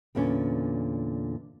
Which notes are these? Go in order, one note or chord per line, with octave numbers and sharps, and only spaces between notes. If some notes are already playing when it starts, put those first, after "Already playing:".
E2 A#2 D3 C#4